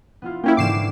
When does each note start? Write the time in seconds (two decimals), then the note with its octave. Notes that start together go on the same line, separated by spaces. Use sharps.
0.22 B3 E4 F4
0.44 A#3 C#4 E4 C#5 G5
0.57 G#2 D3 E3 D6 C7 E7